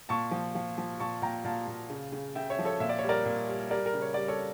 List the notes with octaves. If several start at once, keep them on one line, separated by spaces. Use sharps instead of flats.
A#2 A5 C#6
F3
F3
F3
A#2 A5 C#6
A#2 G5 A#5
A#2 F5 A5
A#2
C#3
C#3
C#3 E5 G5
C#5 E5
F3
A4 C#5
A#2 E5
D5
C#5
G3
A#4 D5
A#2
G3
G3 A#4 D5
A#4
C#3
C#5
G3 D5
A4 C#5